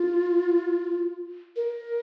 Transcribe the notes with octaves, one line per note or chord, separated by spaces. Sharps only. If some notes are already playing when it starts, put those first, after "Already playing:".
Already playing: F4
A#4